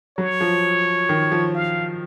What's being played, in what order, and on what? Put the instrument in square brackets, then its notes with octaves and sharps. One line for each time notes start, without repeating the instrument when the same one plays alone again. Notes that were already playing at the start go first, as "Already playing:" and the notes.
[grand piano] F#3 [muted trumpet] C#5
[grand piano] F3
D#3
F3
[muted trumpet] F5